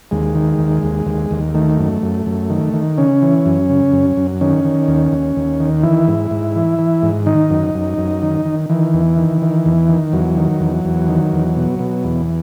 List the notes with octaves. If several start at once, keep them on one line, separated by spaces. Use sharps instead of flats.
D#2 G#3
D#3
D#2
D#2
D#2
D#2
D#3 A3
F#2
F#2
F#2
D#3
D#3
C#3 C#4
E3
F#2
C#3
F#2
F#2
D#3 C#4
D#3
D#2
D#2
D#2
D#3
E3 E4
G#2
G#2
E3
E3
G#2
D#3 D#4
F#2
F#2
F#2
D#3
D#3
D#3 E3
E2
D#3
D#3
E2
D#3
E2 F#3
D#3
E2
E2
D#3
E2
B2
B2
E2